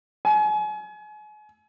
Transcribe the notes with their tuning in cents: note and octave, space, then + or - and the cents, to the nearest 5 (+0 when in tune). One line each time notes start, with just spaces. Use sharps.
G#5 +35